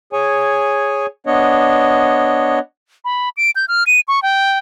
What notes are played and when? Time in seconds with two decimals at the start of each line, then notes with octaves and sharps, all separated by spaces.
0.13 G#4 C#5 G#5
1.27 B3 D4 C#5 D#5
3.05 B5
3.37 D7
3.56 G6
3.68 F6
3.87 D#7
4.08 C#6
4.22 G5